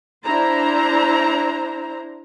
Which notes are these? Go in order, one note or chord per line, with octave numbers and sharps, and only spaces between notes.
D4 E4 C5 A#5